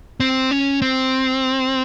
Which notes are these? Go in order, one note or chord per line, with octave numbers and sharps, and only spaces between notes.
C4
C#4
C4